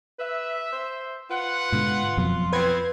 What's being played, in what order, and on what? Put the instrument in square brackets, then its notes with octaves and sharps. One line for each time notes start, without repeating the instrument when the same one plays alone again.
[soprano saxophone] B4 [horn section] E5
[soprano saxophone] C5
[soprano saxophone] F4 [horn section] B4 F#5
[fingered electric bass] G#2 B2 D3 [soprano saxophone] F4
[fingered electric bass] F2 B2 F#3
[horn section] B3 C4 [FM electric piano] B4 G#6